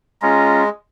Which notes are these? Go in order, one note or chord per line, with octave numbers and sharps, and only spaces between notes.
G#3 C#4 F4 A#5